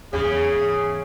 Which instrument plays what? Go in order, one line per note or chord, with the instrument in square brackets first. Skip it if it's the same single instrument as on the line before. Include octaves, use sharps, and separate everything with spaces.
[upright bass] E2 G#2 [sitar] C#3 [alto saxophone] G#4